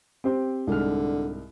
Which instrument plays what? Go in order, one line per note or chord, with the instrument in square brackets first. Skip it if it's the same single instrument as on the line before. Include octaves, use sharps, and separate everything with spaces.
[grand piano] C4 G4 C5
[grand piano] C2 G#2 F6 [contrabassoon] D3